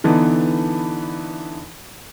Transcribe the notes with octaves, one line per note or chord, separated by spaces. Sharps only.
D3 E3 B3 D4 D#4